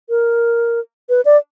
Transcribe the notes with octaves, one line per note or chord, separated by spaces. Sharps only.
A#4
B4
D5